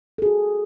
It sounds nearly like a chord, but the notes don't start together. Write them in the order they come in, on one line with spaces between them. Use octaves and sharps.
A4 G#4 F#4